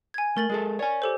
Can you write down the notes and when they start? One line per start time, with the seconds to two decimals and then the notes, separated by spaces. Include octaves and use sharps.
0.14 G#5 G#6
0.37 A3 A#4 A6 F#7
0.49 G#3 G#4 A4
0.79 C#5 D5 G#5
1.02 G4 A4 C5